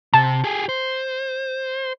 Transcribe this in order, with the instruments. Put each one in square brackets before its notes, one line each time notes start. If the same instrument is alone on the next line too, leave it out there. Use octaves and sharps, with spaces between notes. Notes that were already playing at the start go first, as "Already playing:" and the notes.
[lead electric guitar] C3 [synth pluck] A5
[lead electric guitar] G4 G#4
C5